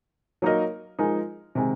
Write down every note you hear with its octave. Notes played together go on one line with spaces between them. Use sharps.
F#3 A#3 D#4 A#4 D#5
F3 G#3 D#4 A#4
C3 D#3 G#3